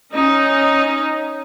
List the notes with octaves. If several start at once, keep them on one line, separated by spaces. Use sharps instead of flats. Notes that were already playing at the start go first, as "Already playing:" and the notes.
C#4 D#4